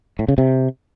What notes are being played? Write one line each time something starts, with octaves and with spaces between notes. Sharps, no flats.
A2
C#3
C3